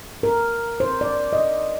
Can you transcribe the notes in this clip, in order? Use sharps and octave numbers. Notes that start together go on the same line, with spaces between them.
A#4
C5
D5
D#5